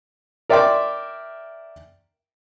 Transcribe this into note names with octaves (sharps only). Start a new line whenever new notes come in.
A#4 D5 E5 G5 C6 D6